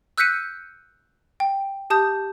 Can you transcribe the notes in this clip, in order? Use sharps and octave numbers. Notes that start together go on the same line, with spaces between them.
E6 F#6 G6 B6 C#7 D#7
G5
G4 A5 D#6 G6